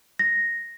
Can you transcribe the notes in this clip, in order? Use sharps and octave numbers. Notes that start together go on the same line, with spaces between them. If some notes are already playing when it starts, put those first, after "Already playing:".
A#6